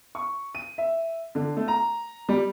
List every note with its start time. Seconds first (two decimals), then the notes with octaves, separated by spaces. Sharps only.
0.15 C#6
0.55 D#7
0.78 E5
1.35 D3
1.57 A3
1.68 A#5
2.29 G3